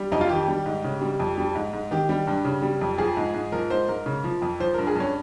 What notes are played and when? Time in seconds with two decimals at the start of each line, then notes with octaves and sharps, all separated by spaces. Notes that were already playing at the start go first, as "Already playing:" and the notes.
Already playing: G3
0.12 F2 D#4
0.21 F4
0.29 D#3 G4
0.48 G3
0.66 G#2
0.84 C#3
1.01 G3
1.20 F2
1.38 G3
1.55 G#2
1.73 G#2
1.91 D#3 G4
2.09 G3
2.27 G2
2.45 C#3
2.62 G3
2.81 F2
2.98 F3 G#4
3.17 G#2
3.35 G#2
3.52 F3 A#4
3.70 G#2 C5
3.88 G#2 A#4
4.06 C#3
4.24 F3
4.42 F2
4.60 F3 C5
4.74 G2 A#4
4.87 G#4
4.96 G2 C#4